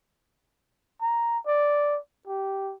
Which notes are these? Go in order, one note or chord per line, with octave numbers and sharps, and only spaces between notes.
A#5
D5
G4